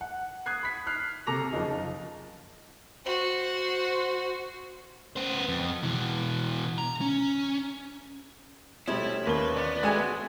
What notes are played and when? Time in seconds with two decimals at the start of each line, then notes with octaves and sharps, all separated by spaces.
0.01 F#5
0.46 D#6 F#6 G#6 C7
0.63 B5 B6
0.86 F6 F#6 C7
1.27 C3 A4 A#5 D6 A#6 F7
1.51 F#1 F3 D#4 G#4
3.05 F#4 C5
5.16 B3 C5
5.49 F2
5.83 B2 E3
6.78 A#5
7.01 C#4
8.88 B2 F3 G3 A3 C#4 E4 E5
9.27 D#2 A#3 B4 G7
9.56 B3 D5
9.83 G#3 D#4 F#4 A4 E5 G#5